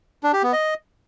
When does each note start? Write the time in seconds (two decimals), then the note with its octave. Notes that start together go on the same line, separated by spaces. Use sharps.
0.23 D4
0.33 G4
0.43 B3
0.53 D#5